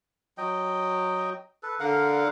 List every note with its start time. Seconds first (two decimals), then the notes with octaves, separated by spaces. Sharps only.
0.38 F#3 D#5 G5
1.63 A4 B4
1.80 D3 A#4 F5 F#5